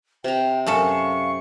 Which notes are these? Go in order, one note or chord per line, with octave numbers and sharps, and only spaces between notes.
C3 G5 A#5
F#2 A4 F5 A5 C#6